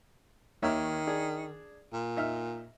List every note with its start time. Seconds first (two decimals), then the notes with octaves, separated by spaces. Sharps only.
0.62 D#2 D#3 C#5 E5
1.07 D4 G#4
1.93 A#2
2.17 D#4 E5 F6